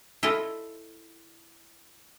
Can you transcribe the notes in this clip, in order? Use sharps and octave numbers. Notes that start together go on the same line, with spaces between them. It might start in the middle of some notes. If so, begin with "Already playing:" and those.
E4 F4 A4 D#5